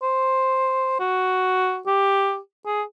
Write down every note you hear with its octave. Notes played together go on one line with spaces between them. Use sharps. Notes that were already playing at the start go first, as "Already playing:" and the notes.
C5
F#4
G4
G#4